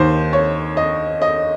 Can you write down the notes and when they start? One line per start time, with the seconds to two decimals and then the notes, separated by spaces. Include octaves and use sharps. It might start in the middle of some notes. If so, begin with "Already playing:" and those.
Already playing: D#2 D#3 C5
0.33 C#5
0.77 D#5
1.22 D#5